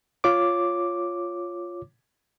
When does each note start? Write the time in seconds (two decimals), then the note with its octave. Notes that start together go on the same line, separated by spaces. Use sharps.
0.24 F4 C#5 D6